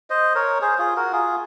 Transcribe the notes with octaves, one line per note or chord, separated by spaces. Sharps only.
C5 D#5
A#4 C#5
G#4 C5
F4 G#4
F#4 A#4
F4 G#4